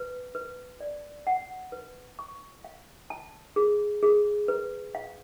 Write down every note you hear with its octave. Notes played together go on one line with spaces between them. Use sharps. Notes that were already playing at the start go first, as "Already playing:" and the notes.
Already playing: B4
B4
D5
F#5
B4
C#6
F5
A5
G#4
G#4
B4
F5